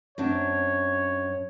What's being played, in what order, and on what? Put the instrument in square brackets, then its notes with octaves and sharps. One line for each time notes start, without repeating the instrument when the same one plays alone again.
[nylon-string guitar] F#2 C4 D4 [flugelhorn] C#5